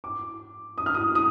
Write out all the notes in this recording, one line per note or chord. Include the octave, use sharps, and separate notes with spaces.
D6
D#6
F6
D#6
D#6